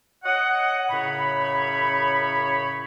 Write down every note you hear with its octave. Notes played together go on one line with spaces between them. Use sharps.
C#5 D#5 F#5
F#2 A2 C#3 C#5 B5